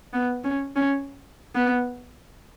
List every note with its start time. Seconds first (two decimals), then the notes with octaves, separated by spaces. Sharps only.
0.13 B3
0.44 C#4
0.76 C#4
1.55 B3